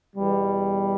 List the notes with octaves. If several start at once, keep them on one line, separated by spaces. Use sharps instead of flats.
E2 B2 G3